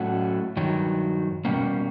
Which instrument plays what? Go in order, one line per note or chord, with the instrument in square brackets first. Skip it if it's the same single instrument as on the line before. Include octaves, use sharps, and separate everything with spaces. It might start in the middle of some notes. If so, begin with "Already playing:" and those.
Already playing: [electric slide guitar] A2 F#3 A3 C#4 F#4
G2 D#3 F#3
B2 G3 A#3 C#4